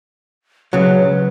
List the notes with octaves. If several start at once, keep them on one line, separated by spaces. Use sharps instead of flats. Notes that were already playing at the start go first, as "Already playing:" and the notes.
C#2 C#3 F#3 B4